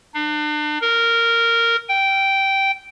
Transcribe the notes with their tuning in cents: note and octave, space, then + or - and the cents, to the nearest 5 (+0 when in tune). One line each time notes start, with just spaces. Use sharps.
D4 +40
A#4 -10
G5 -10